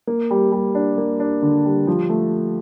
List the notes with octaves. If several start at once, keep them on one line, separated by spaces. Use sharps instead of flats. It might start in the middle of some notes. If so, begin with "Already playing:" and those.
A#3
G3
G3
D4
A#3
D4
D3
G3
F3
A3